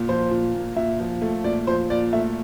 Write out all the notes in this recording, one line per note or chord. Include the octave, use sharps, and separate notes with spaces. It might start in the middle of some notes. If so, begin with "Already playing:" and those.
Already playing: A#2
F3 C5
A#2
A#2
A#2 E5
F3
A3
A#2 D5
F3 C5
A#2 D5
A3 E5